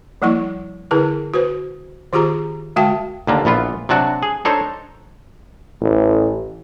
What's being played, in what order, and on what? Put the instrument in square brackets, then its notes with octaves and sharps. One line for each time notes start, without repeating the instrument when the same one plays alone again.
[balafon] F3 G3 A#3 E4 C#6
D3 E4 G#4 A#4 B4
F#4 B4 C5
D#3 F4 G4 G#4 A#5
D3 G#3 F#4 E5 G5 A5
[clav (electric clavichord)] D#2 D3 A#3
A#1 E3 B3 F4
C3 F#3 D4 F#4
G#4
D4 D#4 A4 C5 C#5
[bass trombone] A1